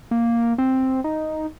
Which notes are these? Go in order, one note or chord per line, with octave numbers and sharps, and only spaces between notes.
A#3
C4
D#4